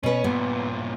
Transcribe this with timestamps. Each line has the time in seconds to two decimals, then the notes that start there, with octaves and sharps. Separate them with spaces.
0.03 B2 C#4 B4
0.24 G2 A#2 B3